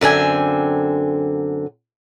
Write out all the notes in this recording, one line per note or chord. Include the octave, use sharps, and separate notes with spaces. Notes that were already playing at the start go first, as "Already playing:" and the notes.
F#2 D3 C4 G#5